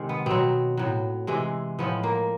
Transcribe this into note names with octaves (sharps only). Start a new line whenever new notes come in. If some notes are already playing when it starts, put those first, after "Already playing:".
Already playing: C3 D#3 G#3
B3
B2 F#3 C4
A2 F#3
C3 E3 G#3
A2 F3 G#3 B3
A#3